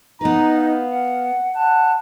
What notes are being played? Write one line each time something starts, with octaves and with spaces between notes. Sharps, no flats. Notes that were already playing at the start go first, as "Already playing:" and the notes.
B3 D#4 B4 A#5
F5
F#5
F#5 A5